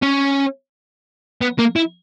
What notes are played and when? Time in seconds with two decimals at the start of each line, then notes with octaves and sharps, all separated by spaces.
0.02 C#4
1.41 B3
1.59 A#3
1.76 E4